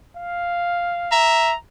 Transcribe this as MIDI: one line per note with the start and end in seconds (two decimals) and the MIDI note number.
0.17 1.12 77
1.12 1.54 76
1.12 1.55 82